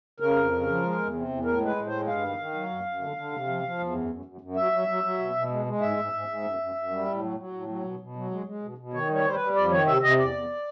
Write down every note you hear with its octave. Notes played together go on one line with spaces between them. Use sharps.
C#3 A#4
F2
C#3
F3
G#3
E2
C3
E2
A2 A#4
G#3
B4
A2
C5
G#3
G2 F5
D#3
D#3
F#3
F#2
F#2
D3
D3
C3
F3
F3
E2
F#2
F#2
F#2
F#2
F#3 E5
F#3
F#3
F#3
B2
B2
G#3
G#3
G#2 E5
G#2
G#2
G#2
F#2
F#2
F#2
G3
A2
F#3
F#3
A2
F#3
B2
B2
F#3
G#3
G#3
B2
B2
D#3 C#5
G3 C#5
G3 C5
B4
G3
F2 D5
D#3 C#5
C3 E5
C3 D#5
E2 D5
E2